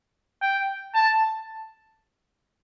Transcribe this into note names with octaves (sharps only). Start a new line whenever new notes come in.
G5
A5